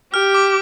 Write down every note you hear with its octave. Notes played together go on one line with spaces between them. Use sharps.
G4 F6
D6